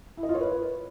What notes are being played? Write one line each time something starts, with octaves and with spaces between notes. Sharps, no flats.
E4
D#5
F4
C#5
B4